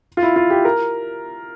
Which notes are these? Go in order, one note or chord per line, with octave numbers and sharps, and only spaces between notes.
F4
E4
F4
G4
A#4